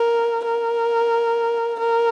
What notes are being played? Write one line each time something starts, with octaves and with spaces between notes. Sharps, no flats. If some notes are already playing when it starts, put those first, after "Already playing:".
Already playing: A#4
A#4
A#4